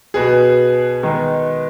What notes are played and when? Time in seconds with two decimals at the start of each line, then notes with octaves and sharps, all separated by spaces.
0.14 B2 B3 G#4
1.03 D#3 G#3 B3 D#4